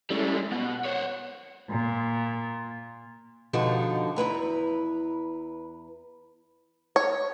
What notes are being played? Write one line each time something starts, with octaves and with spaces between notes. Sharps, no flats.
G3 G#3 C#4 E4 A4
B2 F#5
C5 C#5
A#2
B2 D3 F3 D#4 F#4 G4
E2 E4 B4 A#5
C#5